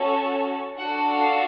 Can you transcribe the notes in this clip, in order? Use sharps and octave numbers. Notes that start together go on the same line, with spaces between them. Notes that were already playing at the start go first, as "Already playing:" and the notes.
Already playing: C#4 F#4 A4
D4 F#4 A4 F#5
F5